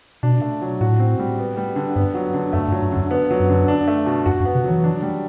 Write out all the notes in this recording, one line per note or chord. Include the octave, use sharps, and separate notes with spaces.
B2 D4
A3
F#3
A2 F#4
C4
G3
B3
G3
D3
G2 B3
F#3
D3
F#2 A3
G2
F#3
G2
F#2 D3
B3
F#3
F#2
D3
D4
A3
B2
F#2 F#4
F#2
B3
C3
F#3
E3
D4
G3